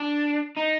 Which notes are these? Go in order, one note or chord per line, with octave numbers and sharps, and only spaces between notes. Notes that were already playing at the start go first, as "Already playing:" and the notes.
Already playing: D4
D#4